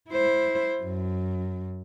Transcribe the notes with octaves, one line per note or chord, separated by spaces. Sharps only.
E4 C5
F#2